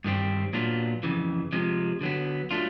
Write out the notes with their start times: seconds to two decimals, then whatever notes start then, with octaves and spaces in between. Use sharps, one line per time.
0.04 G2 D#3 G3 C4
0.53 A#2 F#3 B3 D4 F4
1.03 F2 C#3 E3
1.52 C3 F3 G#3
2.01 D3 F#3 B3
2.51 F#3 A3 D4 F4